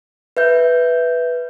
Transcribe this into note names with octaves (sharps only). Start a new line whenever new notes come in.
B4 E5 G6